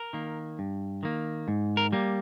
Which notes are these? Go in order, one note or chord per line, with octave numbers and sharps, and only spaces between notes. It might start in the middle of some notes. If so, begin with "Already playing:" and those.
Already playing: A#4
D#3 A#3
G2
D#3 A#3
G#2
A#4
G3 A#3